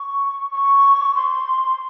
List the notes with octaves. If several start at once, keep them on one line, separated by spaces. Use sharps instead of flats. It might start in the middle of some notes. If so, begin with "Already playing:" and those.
Already playing: C#6
C#6
C6